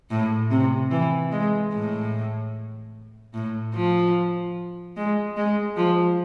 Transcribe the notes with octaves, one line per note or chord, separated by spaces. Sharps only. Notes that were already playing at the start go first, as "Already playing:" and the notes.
A2
C3
E3
G#3
A2
A2
F3
G#3
G#3
F3